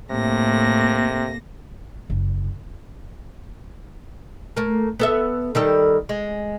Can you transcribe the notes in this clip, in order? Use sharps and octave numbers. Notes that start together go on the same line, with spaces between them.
A2 C3 A3 A#3 A#6
F#1
A3 A#3
B3 A4 E5
D#3 G3 A4
G#3